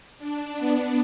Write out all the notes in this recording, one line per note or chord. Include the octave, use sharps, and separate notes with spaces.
D4
B3